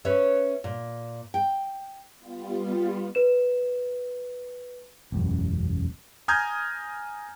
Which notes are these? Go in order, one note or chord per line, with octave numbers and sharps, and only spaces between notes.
C#4 B4 C#5 E5
A#2
G5
G3 B3 F4
B4 E7
E1 A1 F#2
G#5 A#5 D#6 F6 G6 G#6